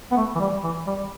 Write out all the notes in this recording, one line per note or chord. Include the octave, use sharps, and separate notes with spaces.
B3
A3
E3
G3
E3
G3